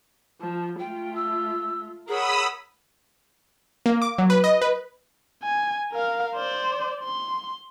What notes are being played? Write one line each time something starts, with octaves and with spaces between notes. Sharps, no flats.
F3 A5
A3 F4 G5
E6
G#4 A#4 C#5 F#5 B5 D#6 E6
A#3
D6
F#3
B4
D#5
B4
G#5
A#4 F5
C5 D5
C6